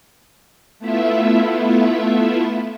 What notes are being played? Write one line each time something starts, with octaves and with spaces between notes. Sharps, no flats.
A3 B3 E4 F4 E5